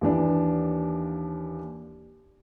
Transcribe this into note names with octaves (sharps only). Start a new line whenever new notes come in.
D#2 E3 D4